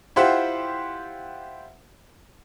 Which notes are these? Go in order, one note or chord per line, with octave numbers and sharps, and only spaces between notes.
E4 F4 G4 C5 E5 F#5